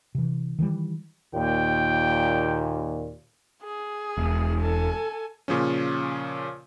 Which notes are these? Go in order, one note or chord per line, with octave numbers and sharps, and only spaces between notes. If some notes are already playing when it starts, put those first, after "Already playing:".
C3 E3
D#3 E3 F#3 G3
D#2 A#2 G5
G#4
E1
A4 G#5
A#2 C#3 F3 C#4